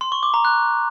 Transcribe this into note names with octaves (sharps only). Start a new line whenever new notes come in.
C6
C#6
D6
A#5
F#6